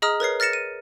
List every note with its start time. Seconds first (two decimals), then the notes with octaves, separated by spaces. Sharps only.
0.02 G#4 D#5 A#5 D#6 F6
0.20 A#4 B4 C#5 C7
0.40 F6 A6 A#6 C#7 E7
0.53 D#7